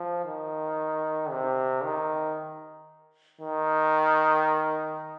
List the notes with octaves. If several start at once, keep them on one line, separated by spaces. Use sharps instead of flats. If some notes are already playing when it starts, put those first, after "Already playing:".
Already playing: F3
D#3
C3
D#3
D#3